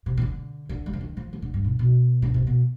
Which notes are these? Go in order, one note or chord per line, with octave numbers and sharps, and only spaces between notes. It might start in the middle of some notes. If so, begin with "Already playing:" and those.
C3
C3
D3
D3
G3
F3
D#3
F3
F3
D3
G2
B2
B2
D3
C3
B2